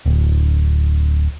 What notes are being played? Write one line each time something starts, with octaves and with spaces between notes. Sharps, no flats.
D1